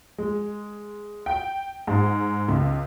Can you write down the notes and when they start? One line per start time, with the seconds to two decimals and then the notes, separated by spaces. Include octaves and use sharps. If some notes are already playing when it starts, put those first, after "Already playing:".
0.18 G#3
1.26 G5
1.87 G#2
2.49 C#2